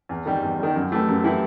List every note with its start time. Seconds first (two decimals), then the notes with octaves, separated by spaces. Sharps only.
0.09 E2
0.26 D#3 G3
0.43 E2
0.59 D#3 G3
0.76 F#2
0.92 E3 A3 E4 G4
1.08 F#2
1.24 E3 A3 E4 G4